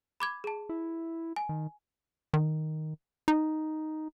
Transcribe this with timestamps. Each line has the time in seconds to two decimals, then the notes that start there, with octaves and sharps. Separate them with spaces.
0.20 B5 D6 G#6
0.44 G#4 A5
0.69 E4
1.36 G#5
1.49 D#3
2.34 D#3
3.28 D#4